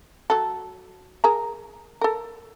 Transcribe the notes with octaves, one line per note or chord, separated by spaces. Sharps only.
F#3 A4
G#4 A#4 A#5
A4 A#4